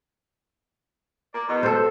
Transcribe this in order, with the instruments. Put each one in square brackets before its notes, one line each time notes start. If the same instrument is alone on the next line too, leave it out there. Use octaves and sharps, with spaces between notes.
[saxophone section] A#3 D5
E2 B2
[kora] A4 C5